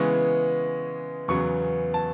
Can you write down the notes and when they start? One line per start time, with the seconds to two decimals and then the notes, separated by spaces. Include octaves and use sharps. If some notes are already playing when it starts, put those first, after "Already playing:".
Already playing: C#3 E3 G#3 B3 C#6
1.28 E2 C#3 F#3 B3 C#6
1.94 A5